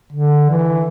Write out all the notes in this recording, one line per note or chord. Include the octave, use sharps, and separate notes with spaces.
D3
E3